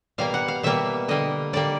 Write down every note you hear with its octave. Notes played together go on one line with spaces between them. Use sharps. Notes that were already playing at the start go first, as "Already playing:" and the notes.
B2 G3 A#3 F5
F#5
F5
B2 G3 A#3 E5
D3 G3 A#3 D#5
D3 G3 A#3 D5